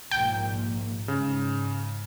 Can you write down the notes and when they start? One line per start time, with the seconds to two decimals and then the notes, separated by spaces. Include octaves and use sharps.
0.11 A#1 G#2 A#3 G5
1.08 G#2 C#3